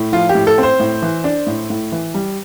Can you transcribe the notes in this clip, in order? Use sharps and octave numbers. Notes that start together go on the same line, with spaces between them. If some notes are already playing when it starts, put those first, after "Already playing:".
Already playing: A2
F3 F4
G4
A2
A4
C4 C5
A2
E3
D4
A2
A2
E3
G3